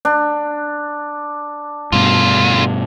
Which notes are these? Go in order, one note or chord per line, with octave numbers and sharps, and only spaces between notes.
D4
G2 B2 D3 F4